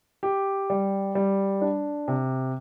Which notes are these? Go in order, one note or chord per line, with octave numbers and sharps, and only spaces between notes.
G4
G3
G3
D4
C3